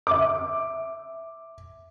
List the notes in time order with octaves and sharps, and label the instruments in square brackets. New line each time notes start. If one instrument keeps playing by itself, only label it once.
[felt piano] E5 D6